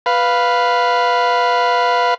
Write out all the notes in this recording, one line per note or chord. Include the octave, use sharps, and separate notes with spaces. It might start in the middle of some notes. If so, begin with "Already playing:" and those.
B4 F5